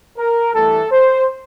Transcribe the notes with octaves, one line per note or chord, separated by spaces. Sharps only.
A#4
G2 E3 A3 A4
C5